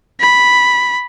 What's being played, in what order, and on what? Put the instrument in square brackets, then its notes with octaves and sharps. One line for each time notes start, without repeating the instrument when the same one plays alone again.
[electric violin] B5